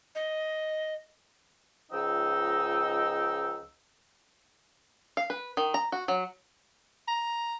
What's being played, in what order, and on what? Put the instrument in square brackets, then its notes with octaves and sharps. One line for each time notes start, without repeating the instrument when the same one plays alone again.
[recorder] D#5
[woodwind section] C#2 F3 D#4 D#5 G5 E6
[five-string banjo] F5
B4
D#3
A#5
F#4
F#3
[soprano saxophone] A#5